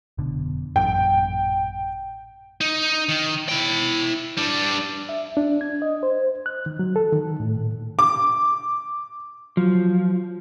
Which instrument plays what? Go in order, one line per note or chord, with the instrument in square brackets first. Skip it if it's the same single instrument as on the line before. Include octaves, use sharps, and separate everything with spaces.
[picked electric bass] F1 B2 D3
[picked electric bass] A1 F#2 A#2 [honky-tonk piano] G5
[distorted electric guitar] D#4
D#3
E4 G5
G3 D4
[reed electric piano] E5
D4
G#6
D#5
C5
F#6
D#3
F#3
A4
D#3
A2
A#2
[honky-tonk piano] D6
[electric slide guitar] F3 [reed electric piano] F#3